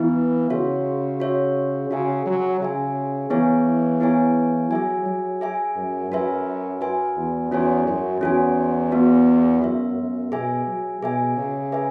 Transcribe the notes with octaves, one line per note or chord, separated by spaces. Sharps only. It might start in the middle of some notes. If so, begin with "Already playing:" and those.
Already playing: E3 B3 E4 B4
C#3 F#4 C#5 E5
F#4 C#5 E5
C#3 F#4 E5 G#5
F#3
C#3 F#4 E5 G#5
E3 B3 E4 G#4 C#5 G#5
B3 E4 G#4 C#5 G#5
F#3 G#4 E5 G#5
F#3
G#4 E5 G#5
F#2
F#2 F#4 B4 E5 G#5
F#4 B4 E5 G#5
E2
E2 C#4 F#4 C#5 G#5
F#2
E2 C#4 F#4 C#5 G#5
B3 F#4 E5
F#2 B3 F#4 E5
F#2
B2 G#4 E5 G#5
F#3
B2 G#4 E5 G#5
C#3
G#4 B4 E5 G#5